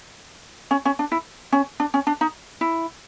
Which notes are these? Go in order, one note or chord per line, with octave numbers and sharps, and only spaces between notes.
C#4
C#4
D4
E4
C#4
D4
C#4
D4
D#4
E4